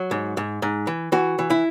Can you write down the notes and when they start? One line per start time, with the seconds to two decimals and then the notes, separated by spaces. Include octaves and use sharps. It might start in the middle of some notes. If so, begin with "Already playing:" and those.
Already playing: F#3
0.11 G#2
0.37 G#2
0.62 G#2
0.87 E3
1.12 E3 F#4
1.39 E3
1.50 E4